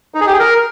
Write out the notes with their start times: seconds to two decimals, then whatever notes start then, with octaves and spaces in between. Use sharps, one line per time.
0.14 D#4
0.21 G#4
0.27 G4
0.33 G#4
0.39 A#4